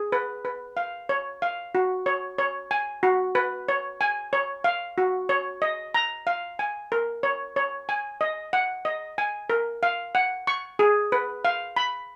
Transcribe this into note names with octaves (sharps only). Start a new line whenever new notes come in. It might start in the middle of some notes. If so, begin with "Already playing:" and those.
Already playing: G#4
B4
B4
F5
C#5
F5
F#4
C#5
C#5
G#5
F#4
B4
C#5
G#5
C#5
F5
F#4
C#5
D#5
A#5
F5
G#5
A#4
C#5
C#5
G#5
D#5
F#5
D#5
G#5
A#4
F5
F#5
C#6
G#4
B4
F5
B5